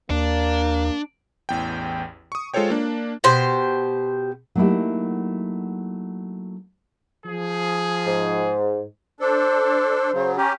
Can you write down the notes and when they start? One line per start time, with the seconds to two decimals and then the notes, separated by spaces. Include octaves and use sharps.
0.10 D#2 A#3 D4
1.49 A1 E2 G5
2.32 C#6 D#6
2.54 G#3 F4 A4 C5 C#5 G5
2.70 A#3 D4
3.24 B2 G4 C5
4.55 F#3 A3 A#3 D#4 E4 G4
7.25 F3 G#4
8.06 G#2
9.20 D4 A4 C5
10.14 C#3 F#3
10.37 C#4 G4 A#5